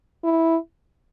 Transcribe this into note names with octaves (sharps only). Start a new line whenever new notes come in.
E4